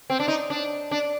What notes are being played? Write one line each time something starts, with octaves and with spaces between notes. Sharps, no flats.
C4
D4
D#4
D4
D4